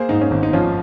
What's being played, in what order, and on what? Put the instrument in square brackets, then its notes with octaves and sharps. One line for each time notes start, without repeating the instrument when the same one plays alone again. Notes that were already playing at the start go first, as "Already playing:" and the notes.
Already playing: [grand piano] A#3 G#4 C5
G#2 D#4
C#4
G#1
D#4
F3 C#4 F4